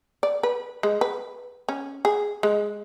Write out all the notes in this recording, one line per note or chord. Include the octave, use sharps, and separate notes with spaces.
D5
B4
G#3
B4
C#4
G#4
G#3